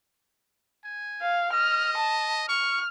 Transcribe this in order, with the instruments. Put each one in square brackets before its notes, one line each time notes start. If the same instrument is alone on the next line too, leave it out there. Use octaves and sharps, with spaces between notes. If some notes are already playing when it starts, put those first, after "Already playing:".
[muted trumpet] G#5
[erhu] F5
[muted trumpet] D#5 [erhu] F6
[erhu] A5
[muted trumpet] C#6 [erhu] F6